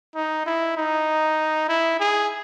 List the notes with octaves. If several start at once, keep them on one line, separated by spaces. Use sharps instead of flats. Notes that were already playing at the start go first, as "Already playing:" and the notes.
D#4
E4
D#4
E4
G#4